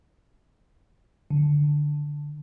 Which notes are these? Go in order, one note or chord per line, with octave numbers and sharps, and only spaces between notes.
D3